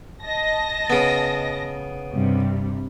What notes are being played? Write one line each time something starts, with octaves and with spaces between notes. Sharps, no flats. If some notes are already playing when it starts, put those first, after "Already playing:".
D#5 A5 A#6
C#3 B3
G2 C3 G3